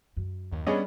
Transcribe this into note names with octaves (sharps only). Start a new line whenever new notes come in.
F#2
D#2
G3 B3 C#4 D4 G#4 C#5 D#5